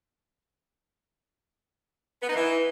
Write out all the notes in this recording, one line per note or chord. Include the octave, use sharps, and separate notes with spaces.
B3
D#4
E3